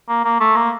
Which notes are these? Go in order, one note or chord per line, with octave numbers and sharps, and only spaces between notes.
A#3
A#3
A3
A#3